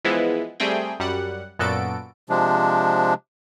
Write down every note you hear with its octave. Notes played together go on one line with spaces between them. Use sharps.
E3 F3 G#3 B3 E4
G3 A3 C4 G#4 G5
F#2 G3 F#5
F#2 A#2 B3 F#4 A4 D7
C3 F3 G#3 D4